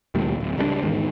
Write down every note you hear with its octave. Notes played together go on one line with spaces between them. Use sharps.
A1 D2 A#2 G3
D1
C#2 G3 G#3 D4
E2 G#2 D#3